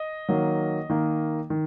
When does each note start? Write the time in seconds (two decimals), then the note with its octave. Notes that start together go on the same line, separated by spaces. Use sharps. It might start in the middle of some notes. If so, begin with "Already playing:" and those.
Already playing: D#5
0.28 D#3 F#3 A#3
0.90 D#3 A#3
1.50 D#3